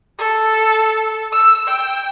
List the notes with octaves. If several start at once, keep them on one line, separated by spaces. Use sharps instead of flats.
A4
E6
G5